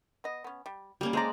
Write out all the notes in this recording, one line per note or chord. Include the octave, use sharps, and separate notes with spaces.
B3 D#5
B3 C#4
G3
G3 A#3 C#4 G4 G#4
G#3 A4 C5 D5 A#5